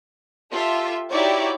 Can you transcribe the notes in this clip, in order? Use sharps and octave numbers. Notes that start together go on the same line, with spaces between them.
F4 G4 A4 E5
D#4 E4 F#4 G4 C#5 D5